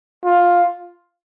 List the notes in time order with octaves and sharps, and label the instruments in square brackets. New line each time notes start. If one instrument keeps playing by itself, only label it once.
[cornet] F4